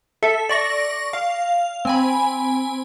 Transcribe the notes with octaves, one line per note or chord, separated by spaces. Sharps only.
A4 E5
D5 C#6 A#6
F5
C4 G#5 B5